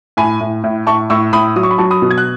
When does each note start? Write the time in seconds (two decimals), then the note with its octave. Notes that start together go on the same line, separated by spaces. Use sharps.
0.17 A2 G#5 B5
0.41 A2
0.64 A2
0.86 A2 A5 C#6
1.10 A2 C#6 E6
1.33 A2 B5 D#6
1.56 F#3 D#6
1.63 C#6
1.71 B5
1.78 F#3 A5 C#6
1.91 B5 D#6
2.02 B2
2.11 G#6
2.18 F#6